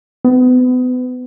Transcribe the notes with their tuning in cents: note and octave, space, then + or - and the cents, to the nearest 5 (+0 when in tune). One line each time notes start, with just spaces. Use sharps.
B3 +35